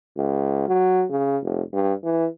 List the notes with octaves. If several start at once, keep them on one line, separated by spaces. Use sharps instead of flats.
C#2
F#3
C#3
F1
G2
E3